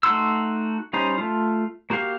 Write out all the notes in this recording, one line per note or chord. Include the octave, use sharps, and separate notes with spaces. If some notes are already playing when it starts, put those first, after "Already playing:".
A3 D#4 F#4 C6 E6
G3 C#4 D#4 C5
A3 F4
A#3 F#4 G4 F5